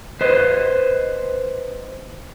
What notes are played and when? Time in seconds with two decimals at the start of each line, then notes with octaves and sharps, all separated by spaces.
0.21 B4 C5 D#5